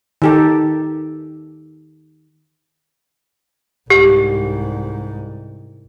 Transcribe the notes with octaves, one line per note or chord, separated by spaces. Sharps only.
D#3 G4 A4
C2 G#2 G4